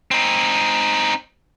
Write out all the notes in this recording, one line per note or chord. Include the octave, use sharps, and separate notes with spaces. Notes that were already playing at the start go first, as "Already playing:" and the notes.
C4 D#4